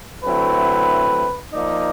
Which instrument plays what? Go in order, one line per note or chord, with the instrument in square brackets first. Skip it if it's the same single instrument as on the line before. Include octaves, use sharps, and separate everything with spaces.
[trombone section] D3 F#3 A3 C4 E4 [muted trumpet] B4
[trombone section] F3 A#3 D#4 [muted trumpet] D5